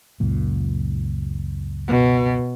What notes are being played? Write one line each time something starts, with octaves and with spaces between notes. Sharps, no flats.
C#2 F#2 A#2
B2